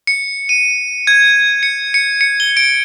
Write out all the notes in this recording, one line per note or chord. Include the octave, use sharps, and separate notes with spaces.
C#7
D#7
G#6
C#7
C#7
C#7
G7
D7